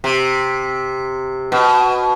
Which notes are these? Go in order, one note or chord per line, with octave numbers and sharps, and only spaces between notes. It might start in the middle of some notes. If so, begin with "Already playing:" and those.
C3
B2